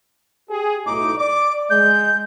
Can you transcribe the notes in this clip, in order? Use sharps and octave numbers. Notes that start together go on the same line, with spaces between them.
G4 G#4
B1 A2 D#4 D6
D5 D6
G#3 G6